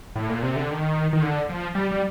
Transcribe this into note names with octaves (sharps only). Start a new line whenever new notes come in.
A2
A#2
C3
D3
D#3
D#3
D3
F3
G3
G3